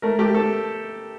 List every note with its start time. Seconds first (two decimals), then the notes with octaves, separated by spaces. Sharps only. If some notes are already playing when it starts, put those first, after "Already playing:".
0.02 A3 A#4
0.19 A3 G4
0.34 A3 A4